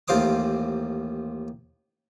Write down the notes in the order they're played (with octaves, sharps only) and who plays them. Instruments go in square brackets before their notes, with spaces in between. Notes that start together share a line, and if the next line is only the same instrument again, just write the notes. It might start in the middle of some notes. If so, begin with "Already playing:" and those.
[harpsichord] A1 D#2 F4 C5 D6 D#6